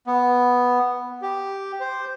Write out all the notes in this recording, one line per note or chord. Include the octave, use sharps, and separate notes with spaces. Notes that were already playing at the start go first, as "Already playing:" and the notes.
B3
G4
C5